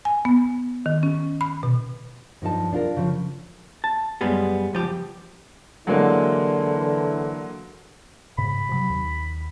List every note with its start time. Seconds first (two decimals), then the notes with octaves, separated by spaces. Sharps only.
0.05 G#5
0.25 B3
0.86 D#3
1.03 C#4
1.41 B5
1.63 B2
2.42 G2 F3 D#4 A5
2.73 D4 F4 A#4
2.97 C#3 F3
3.84 A5
4.21 F#2 G3 G#3 B3
4.73 C#2 F3 G4
5.87 D3 E3 F#3 G#3 A#3
8.38 G#2 C#3 B5
8.69 C3 D#3 F#3
8.90 D#2